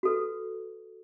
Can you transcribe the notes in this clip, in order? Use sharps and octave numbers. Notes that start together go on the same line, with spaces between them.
F#4 A4 B4